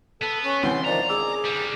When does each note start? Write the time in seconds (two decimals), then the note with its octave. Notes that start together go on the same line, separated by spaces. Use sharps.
0.22 B3 A4
0.45 C#4 C#6
0.63 C2 E3 F#5 G5 C6
0.85 D#3 F3 D5 A#5
1.09 G#4 D6 E6
1.45 D3 G3